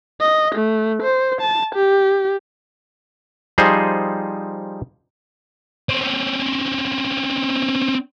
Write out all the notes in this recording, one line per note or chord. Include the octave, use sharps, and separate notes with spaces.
D#5
A3
C5
A5
G4
F3 G3 D#4 G#4 C5
C4 C#4